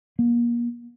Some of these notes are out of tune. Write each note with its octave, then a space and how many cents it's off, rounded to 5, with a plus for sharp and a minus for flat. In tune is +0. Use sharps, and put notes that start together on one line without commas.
A#3 +30